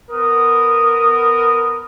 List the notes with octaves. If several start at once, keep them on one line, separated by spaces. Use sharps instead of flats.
B3 A#4 D#6